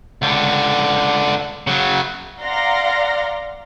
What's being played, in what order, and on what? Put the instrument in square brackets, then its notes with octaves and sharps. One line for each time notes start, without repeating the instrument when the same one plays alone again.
[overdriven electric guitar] C#2 D3
C#3 F#3
[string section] D5 F5 F#5 A#5 C6 A#6